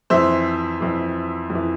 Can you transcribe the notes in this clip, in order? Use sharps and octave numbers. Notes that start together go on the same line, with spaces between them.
F2 E3 C5 E5
F2 E3
F2
E3